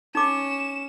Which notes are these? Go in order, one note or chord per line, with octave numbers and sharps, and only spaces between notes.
C#4 D#4 D6 E7